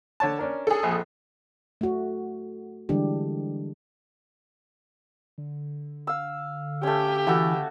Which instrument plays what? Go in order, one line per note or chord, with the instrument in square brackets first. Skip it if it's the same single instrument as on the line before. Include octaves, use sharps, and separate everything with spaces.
[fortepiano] D3 C#5 A5
C#4 D4 A#4
[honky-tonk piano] G#4 A4
[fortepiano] A#1 F2
[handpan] A3 F#4
D3 E3 G3 G#3 D4 G4
[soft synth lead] D3
[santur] F5 E6
[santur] A3 C#4 [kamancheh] G4
[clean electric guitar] E3 [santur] A3 F#4 A4